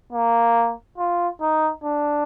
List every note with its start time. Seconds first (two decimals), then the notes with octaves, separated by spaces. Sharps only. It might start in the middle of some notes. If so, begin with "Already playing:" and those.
0.13 A#3
0.98 F4
1.41 D#4
1.84 D4